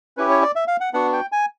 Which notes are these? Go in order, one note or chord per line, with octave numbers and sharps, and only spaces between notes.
C#4 E4 G4 B4
C#5
D5
E5
F5
F#5
B3 D4 F#4 F#5
G5
G#5